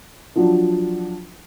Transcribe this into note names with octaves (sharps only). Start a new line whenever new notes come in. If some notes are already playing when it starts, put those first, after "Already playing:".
F3 F#3 D4